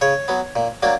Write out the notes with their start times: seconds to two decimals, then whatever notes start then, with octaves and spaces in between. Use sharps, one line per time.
0.01 C#3 C#5
0.28 F#3 B3
0.56 A#2
0.83 F#3 A#3 D4